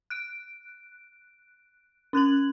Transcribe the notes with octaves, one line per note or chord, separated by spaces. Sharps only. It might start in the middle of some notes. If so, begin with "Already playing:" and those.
F#6 D7
C#4 F#6 G#6 F#7